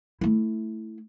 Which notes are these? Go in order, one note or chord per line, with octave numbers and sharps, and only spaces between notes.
A3 E4